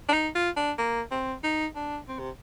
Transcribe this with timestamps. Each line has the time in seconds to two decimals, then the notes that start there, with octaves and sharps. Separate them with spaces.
0.09 D4
0.13 D#4
0.35 F4
0.57 D4
0.78 A#3
1.11 C4
1.44 D#4
1.75 D4
2.09 C4
2.19 C3